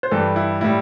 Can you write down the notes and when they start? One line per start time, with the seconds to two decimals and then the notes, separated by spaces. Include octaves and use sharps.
0.03 C5
0.11 G2 E3 G3 A4
0.36 E4
0.60 A2 G3 E4